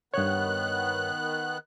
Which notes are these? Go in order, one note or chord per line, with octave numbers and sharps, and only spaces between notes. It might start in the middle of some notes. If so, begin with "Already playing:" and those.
G2 D#3 B3 C#5 F#6